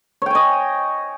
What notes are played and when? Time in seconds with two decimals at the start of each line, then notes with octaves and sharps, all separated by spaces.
0.22 C#5
0.26 G5
0.31 G#5
0.35 D#5